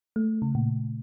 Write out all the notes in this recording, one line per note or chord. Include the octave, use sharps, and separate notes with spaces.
A3
C#3
A#2